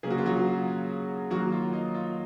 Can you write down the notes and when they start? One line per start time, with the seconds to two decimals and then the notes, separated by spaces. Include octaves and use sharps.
0.03 C#3 F#3 A#3 G#4
0.10 F#4
0.18 F4
0.26 F#3 F#4
1.30 D#3 F#3 A#3 F#4
1.52 F4
1.73 D#4
1.94 F4